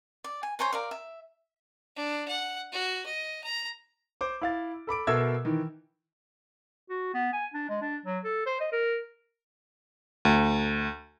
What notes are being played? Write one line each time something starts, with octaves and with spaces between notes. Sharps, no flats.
D5
G#5
C5 C#5 G#5 A#5
A#4 D5 F5
E5
D4
F#5
F#4
D#5
A#5
C5 D6
E4 F5 A6
A4 B5 D6 D7
B2 A4 A#4 E5 E6 G#6
D#3 E3
F#4
B3
G#5
D4
G#3
D4
F#3
A4
C5
D#5
A#4
D2